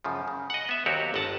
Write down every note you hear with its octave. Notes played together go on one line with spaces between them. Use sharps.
F#2 C#3 F3
C#3
D#5 F#5
B3 E5
D#2 F#3 C4 F#4 G4 C#5
G1 D#5 F#5 A5